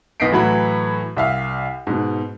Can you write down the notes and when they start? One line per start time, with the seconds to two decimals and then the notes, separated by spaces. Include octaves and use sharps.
0.20 B1 B3 D#5 B6 C7 D7
0.32 A2 E3 F#3 F#4 B5
1.17 C2 E5 F5
1.87 G#2 B2